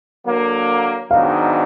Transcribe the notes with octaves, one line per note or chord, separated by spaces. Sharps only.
D3 F#3 A#3
G#2 D#3 F#3 B3 D4 F5